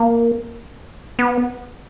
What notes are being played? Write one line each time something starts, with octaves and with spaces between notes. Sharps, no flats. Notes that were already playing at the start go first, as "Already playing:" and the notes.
Already playing: A#3
B3